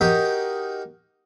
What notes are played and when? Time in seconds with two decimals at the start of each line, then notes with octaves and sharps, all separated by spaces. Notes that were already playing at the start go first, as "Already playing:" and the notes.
0.01 D#4 F#4 G4 A#4 G5